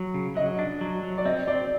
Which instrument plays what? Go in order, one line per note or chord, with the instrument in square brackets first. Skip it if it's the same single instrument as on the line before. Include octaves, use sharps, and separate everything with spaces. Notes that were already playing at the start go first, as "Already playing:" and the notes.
Already playing: [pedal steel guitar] F#3
C#3
[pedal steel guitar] F#3 [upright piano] D#5
[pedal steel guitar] D4
F#3
F#3
[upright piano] D5
[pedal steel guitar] C4 [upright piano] D#5
[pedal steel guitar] C4 [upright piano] D5